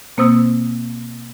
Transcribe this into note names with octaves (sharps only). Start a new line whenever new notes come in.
B2 A#3 C4 C5 D#6 E6